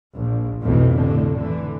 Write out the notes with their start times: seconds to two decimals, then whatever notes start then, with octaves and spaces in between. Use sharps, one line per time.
0.15 A#1
0.61 B1 F2 A2 E3
0.93 F1 A2 D3
1.36 D3 E3